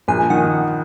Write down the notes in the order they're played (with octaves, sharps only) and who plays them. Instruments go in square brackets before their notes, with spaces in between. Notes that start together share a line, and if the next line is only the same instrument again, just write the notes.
[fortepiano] A#1 [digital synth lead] G#5
[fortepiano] D#3 [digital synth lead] F#5